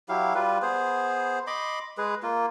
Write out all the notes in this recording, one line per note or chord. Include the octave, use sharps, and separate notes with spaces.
F#3 E4 G4 F5
G3 F4 B4
B3 G#4 C5
D#5 B5 C6 D6
G#3 G#4 B4
A#3 F4